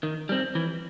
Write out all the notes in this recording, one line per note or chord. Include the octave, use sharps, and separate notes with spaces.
D#3
G3 C4
E3